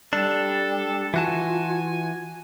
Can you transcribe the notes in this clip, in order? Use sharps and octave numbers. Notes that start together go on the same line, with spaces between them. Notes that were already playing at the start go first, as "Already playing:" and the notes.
G3 D4 A4
E3 F4 F#4 G#5 A5